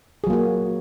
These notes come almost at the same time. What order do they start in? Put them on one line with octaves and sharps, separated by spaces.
G#4 F#3 A#3 F#4